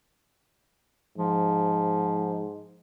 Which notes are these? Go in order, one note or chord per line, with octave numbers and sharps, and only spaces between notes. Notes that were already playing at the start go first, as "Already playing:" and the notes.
G#2 F3